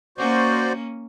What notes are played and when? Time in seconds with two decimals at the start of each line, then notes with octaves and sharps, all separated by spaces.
0.18 A#3 C#4 F#4 C5 D5